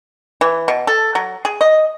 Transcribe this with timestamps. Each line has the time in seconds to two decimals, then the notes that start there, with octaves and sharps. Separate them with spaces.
0.41 E3
0.68 B2
0.87 A4
1.15 F#3
1.45 G#4
1.61 D#5